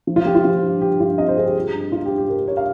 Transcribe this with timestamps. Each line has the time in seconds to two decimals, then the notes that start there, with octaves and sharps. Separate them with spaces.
0.07 F3
0.16 F4
0.26 F3 G4
0.35 F4
0.45 F3
0.63 G2
0.81 G2 G4
1.00 G2 F4
1.18 C4 D#5
1.28 C5
1.37 G2 G#4
1.46 G4
1.55 G2
1.73 G2
1.92 G2 F4
2.05 G4
2.11 G2
2.18 G4
2.29 G2 A#4
2.48 G2 C#5
2.57 F5